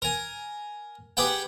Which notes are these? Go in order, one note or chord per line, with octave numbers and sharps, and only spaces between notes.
A#4 G#5
G4 G#4 B4 F#5 G5